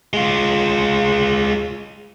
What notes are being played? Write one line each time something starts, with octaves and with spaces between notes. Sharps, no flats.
G#3 F4